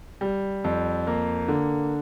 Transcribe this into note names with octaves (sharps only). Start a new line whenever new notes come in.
G3
F2
A#3
D3